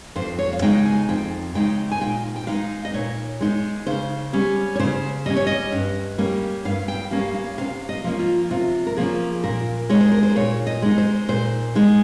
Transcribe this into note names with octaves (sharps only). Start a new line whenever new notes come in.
F2 C5
C#5
F5
C#3 G#3 D#4 G5
G#5
F2 G5
C#3 G#3 D#4 G5
G#5
A#2 G5
G5
G#3 D#4 F5
D#5
A#2 C#5
G#3 D#4
C#3 C5
G3 C#4
C#5
C#3 C5
G3 C#4 D#5
C#5
D#5
G2
G3 A#3 C#4
G2 F5
G5
G3 A#3 C#4 F5
F5
C3 F5
D#5
F3 A#3 C#4
F4
C3 F4
A#4
F3 A#3 C#4 G#4
A#2 A#4
G#3 D#4 C#5
C5
A#4
C5
A#2 C#5
D#5
G#3 D#4
C5
A#2 C5
G#3 D#4